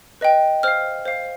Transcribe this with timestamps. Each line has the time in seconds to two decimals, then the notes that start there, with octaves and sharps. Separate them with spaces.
0.21 B4 D#5 G5
0.63 C5 F5 F6
1.05 C5 F5